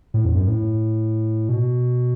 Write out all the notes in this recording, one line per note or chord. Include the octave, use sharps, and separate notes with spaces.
A2
E2
F#2
A2
B2